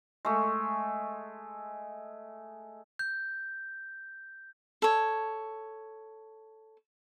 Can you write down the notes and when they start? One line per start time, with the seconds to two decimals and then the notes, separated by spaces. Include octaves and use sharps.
0.25 G#3 A3
2.99 G6
4.82 A4 C#5